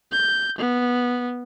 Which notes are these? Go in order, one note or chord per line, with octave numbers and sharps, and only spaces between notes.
G6
B3